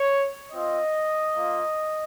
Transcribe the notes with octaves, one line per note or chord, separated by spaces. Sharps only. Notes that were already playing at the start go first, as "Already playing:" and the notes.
Already playing: C#5
C4 F4 D#5
A#3 F4